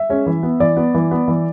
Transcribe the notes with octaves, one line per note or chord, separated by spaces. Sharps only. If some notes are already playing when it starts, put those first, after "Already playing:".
Already playing: E5
G#3 C#4
E3
B3
E3 D5
B3
E3
B3
E3